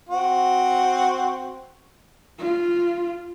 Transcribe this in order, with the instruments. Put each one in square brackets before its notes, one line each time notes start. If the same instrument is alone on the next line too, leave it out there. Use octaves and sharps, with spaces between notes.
[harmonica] C4 F#4
[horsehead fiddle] F4